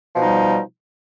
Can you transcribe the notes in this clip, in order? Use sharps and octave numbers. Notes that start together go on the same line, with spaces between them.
B2 F3 G3 D#4